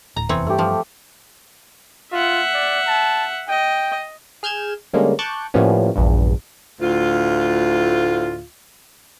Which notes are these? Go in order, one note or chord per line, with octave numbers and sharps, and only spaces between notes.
D1 A2 A#5
F1 E2 E3 C4 C#5
G2 A3 G4
F3
F4 E5 F#5
D5
A5
D#5 G5
G#4 F6 G6 G#6 E7
D3 G3 G#3 A#3 C#4
A5 C#6 D6 F#6 G6
A2 F3 G3 A#3 B3 C#4
A#1 E2 G2
D2 A2 F4